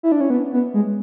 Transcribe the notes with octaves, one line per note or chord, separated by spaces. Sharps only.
E4
D4
C#4
B3
B3
G#3